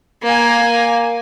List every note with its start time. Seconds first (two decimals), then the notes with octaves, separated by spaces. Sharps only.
0.23 A#3 G#5